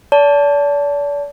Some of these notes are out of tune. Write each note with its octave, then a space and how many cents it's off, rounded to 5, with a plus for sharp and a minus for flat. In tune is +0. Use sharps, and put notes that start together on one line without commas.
D5 -40 A5 +0